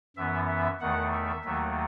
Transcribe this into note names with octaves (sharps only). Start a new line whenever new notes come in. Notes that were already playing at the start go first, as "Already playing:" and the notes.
F#2 E3 B3 E5
E5
E2 D#3 A3 F#5
E5
D#2 D#3 F#3 A3